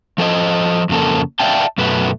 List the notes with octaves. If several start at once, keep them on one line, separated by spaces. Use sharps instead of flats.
F3 A4 C5 D#5
F2 C#3 A#3 A4
D5 E5 F5 G5 A5
F#2 B2 A3 B4